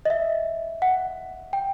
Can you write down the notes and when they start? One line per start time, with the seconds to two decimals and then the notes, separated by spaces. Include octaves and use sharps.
0.05 D#5
0.10 E5
0.82 F#5
1.53 G5